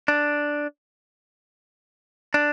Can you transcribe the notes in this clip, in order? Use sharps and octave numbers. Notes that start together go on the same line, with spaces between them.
D4
D4